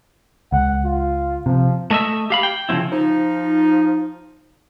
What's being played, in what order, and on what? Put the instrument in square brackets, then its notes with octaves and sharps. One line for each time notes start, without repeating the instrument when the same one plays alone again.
[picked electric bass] C#2 [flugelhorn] F#5
[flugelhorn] F4
[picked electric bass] C3 [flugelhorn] F3
[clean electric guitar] A3 D#5 E5
G4 F5 B5
G5
C#3 F3 F#3 C4 E4
[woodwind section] F3 D#4